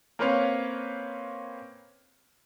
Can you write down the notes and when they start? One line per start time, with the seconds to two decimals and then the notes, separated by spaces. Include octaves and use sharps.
0.19 A#3 C4 C#4 B4 C#5 F5